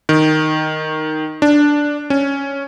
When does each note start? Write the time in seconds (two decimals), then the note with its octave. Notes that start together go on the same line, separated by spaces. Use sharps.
0.09 D#3
1.42 D4
2.10 C#4